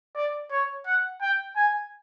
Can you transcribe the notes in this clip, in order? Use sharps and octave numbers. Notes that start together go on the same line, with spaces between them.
D5
C#5
F#5
G5
G#5